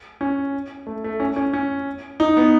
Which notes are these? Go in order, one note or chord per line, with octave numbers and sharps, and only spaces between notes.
C#4
A3
A3
C#4
C#4
C#4
D#4
B3